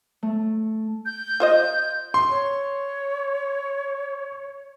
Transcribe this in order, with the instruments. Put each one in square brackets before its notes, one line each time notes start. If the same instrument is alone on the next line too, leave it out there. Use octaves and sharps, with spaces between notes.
[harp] A3
[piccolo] G6
[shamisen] F4 C5 D#5
[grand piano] C6
[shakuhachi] C#5